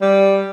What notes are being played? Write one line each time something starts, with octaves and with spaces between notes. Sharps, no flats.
G3